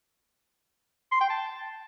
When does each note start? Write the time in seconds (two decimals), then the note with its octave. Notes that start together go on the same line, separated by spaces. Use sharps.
1.12 C6
1.21 G5
1.30 A5